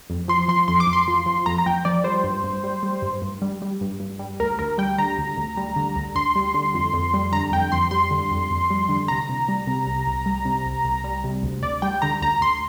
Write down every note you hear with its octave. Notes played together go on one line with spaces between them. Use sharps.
F2
F3 C6
F3 C6
F2 C6
D6
F2
C6
F3
F3
F2 A#5
A#5
F2 G5
F3 D5
G3 C5
G2
G2
G3
G3
G2
G2
G3
G3
G2
G2
G3
D2 A#4
D2 A#4
G3 G5
D3 A#5
D2
D2
G3
D3
D2
D2 C6
G3
D3
F2
F2
G3
D3 A#5
F2 G5
F2 C6
G3 C6
D3
F2
F2
G3
D3
C2 A#5
C2
G3
C3
C2
C2
G3
C3
C2
C2
G3
C3
D2
D2 D5
G3 G5
D3 A#5
D2 A#5
D2 C6